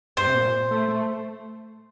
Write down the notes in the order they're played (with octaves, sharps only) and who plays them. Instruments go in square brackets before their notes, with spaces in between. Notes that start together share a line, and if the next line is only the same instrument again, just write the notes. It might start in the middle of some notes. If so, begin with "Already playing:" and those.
[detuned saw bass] G2 [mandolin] C5
[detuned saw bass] C3
A#2
A3
A3